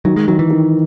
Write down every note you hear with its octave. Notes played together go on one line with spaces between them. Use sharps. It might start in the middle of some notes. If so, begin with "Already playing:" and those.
D#3 F#3
G#3
D#3 F#3
E3
D#3